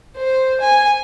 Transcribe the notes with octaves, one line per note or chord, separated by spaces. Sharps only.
C5
G#5